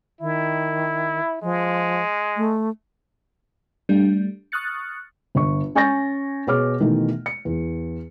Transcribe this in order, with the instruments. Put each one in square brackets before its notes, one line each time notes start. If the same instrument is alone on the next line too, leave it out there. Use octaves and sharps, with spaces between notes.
[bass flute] D#3 [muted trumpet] E4
[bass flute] F3 [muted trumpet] G#3
[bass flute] A3
[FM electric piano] G3 A3 D4
C#6 D#6 F6 F#6 A6 C#7
[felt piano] G1 C#6
C#4 G#5 C#6 G6 A6 A#6
B2 G#4 C#5 D6 F6
B2 D#3 E3 A3
C#7
E2